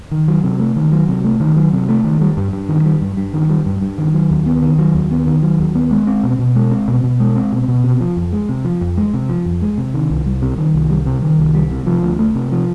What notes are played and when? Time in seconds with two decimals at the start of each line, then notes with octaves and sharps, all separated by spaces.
0.11 D#3
0.28 F#3
0.44 C3
0.60 A3
0.76 D#3
0.92 F#3
1.08 C3
1.24 A3
1.40 D#3
1.57 F#3
1.73 C3
1.89 A3
2.04 D#3
2.21 G3
2.37 G2
2.53 G2
2.69 D#3
2.85 G3
3.01 G2
3.17 G2
3.33 D#3
3.50 G3
3.66 G2
3.81 G2
3.98 D#3
4.14 F#3
4.30 D#2
4.46 B3
4.62 D#3
4.78 F#3
4.94 D#2
5.11 B3
5.27 D#3
5.43 F#3
5.59 D#2
5.75 B3
5.91 G#3
6.07 C4
6.24 B2
6.39 B2
6.55 G#3
6.71 C4
6.88 B2
7.04 B2
7.20 G#3
7.36 C4
7.52 B2
7.68 B2
7.84 C3
8.01 F3
8.17 F2
8.33 G#3
8.49 C3
8.65 F3
8.81 F2
8.97 G#3
9.14 C3
9.29 F3
9.45 F2
9.62 G#3
9.78 C3
9.94 D#3
10.10 C2
10.26 G3
10.42 C3
10.58 D#3
10.74 C2
10.90 G3
11.06 C3
11.22 D#3
11.39 C2
11.55 G3
11.71 C3
11.86 F3
12.03 D2
12.19 A3
12.35 C3
12.51 F3